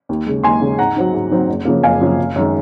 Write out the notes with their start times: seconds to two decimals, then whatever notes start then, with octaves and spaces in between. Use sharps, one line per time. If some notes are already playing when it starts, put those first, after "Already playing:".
0.09 D#2
0.26 C#3 G#3
0.43 D#2 G#5 C6
0.61 C#3 G#3
0.78 G#2 F#5 A#5
0.96 F#3 C4 D#4
1.14 G#2
1.31 F#3 C4 D#4
1.49 F#1
1.65 F#2 C#3 F3 A#3
1.83 F#1 F5 G#5
2.01 F#2 C#3 F3 A#3
2.19 F#1
2.36 F#2 D#3 G#3